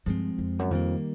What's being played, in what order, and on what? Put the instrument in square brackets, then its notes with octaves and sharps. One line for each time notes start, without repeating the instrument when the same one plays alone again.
[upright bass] G2 [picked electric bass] F3 G#3 C4
[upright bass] F2
F#2
[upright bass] F2 [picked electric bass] D#3 G3 A#3